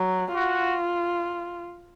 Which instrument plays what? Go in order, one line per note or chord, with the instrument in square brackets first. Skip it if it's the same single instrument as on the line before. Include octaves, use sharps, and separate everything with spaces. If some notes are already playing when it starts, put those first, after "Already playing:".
Already playing: [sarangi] F#3
[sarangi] F4 [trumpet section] F#4